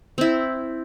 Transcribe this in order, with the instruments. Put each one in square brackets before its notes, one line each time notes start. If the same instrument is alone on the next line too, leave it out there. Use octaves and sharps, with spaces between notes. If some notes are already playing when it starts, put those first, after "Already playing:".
[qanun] C4 E4